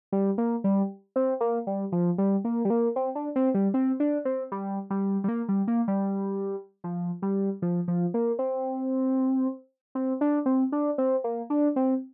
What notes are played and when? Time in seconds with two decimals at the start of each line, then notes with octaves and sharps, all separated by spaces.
0.12 G3
0.38 A#3
0.64 G3
1.16 C4
1.41 A#3
1.67 G3
1.92 F3
2.18 G3
2.45 A#3
2.65 G3
2.70 A#3
2.96 C4
3.15 D4
3.36 C4
3.54 G3
3.74 C4
4.00 D4
4.25 C4
4.52 G3
4.90 G3
5.24 G3
5.28 A#3
5.49 G3
5.68 A#3
5.88 G3
6.84 F3
7.22 G3
7.62 F3
7.88 F3
8.14 A#3
8.39 C4
9.95 C4
10.21 D4
10.46 C4
10.72 D4
10.98 C4
11.24 A#3
11.50 D4
11.76 C4